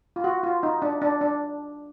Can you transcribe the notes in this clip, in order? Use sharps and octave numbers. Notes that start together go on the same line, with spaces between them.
F4
F#4
F4
D#4
D4
D4
D4